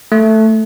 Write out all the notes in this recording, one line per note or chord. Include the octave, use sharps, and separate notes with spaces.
A3